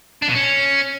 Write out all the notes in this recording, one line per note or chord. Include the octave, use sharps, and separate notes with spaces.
D4
B2
C#4